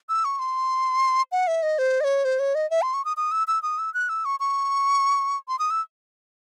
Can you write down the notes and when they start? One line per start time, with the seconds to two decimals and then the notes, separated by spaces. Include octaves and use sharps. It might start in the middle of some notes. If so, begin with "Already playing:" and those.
0.09 E6
0.25 C#6
0.39 C6
1.32 F#5
1.47 E5
1.63 D#5
1.79 C5
2.01 D#5
2.04 C#5
2.25 C5
2.39 C#5
2.55 D#5
2.70 E5
2.82 C6
2.94 C#6
3.05 D#6
3.17 D#6
3.31 E6
3.48 E6
3.63 D#6
3.78 E6
3.94 F#6
4.09 E6
4.25 C#6
4.40 C#6
5.48 C6
5.59 D#6
5.70 E6